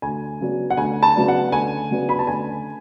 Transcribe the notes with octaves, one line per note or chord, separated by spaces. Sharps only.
D2 G#5
C#3 F#3 B3 D4
F#5
D2 G#5
A5
C#3 F#3 B3 D4
F#5
D2 G#5
C#3 F#3 B3 D4
B5
A5
D2 G#5